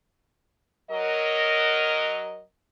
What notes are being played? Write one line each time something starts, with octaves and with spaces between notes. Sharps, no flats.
F#3 A#4 D#5